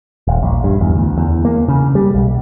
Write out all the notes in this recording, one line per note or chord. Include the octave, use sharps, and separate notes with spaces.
D#1
A#1
G2
E2
D2
E2
A#3
C#3
G3
B1